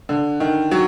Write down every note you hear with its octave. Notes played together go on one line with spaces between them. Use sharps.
D3
D#3
F#3